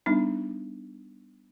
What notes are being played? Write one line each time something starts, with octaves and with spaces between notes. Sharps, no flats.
G3 B3 D4 D#4